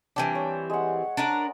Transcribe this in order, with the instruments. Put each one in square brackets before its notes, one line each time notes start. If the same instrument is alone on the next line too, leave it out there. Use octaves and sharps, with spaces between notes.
[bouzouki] E3 G3 C4 [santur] D4
[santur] C#5
G#3 F#5
[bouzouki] D4 A#4 B4